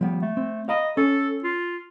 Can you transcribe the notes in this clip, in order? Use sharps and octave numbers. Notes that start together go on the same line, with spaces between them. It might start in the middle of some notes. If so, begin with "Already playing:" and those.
F3 G3 B3
A3
C4
D#5 F5 A#5 B5
C#4 A4
F4